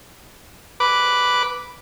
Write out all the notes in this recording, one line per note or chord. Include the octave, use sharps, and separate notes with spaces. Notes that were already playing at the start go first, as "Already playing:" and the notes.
B4 D6